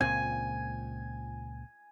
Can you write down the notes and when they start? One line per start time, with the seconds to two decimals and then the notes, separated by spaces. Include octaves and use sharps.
0.01 C#2 A#2 C4 G#5